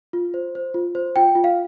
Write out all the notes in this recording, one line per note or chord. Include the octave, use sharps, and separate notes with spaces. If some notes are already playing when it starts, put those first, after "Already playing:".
F4
C5
C5
F4
C5
F4 G5
F4
F5